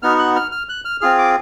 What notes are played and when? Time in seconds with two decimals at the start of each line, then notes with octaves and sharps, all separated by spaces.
0.02 B3 D#4 F#4 F6
0.19 F#6
0.36 F6
0.52 F6
0.69 F#6
0.85 F6
1.01 C4 F4 G#4 F6
1.18 D6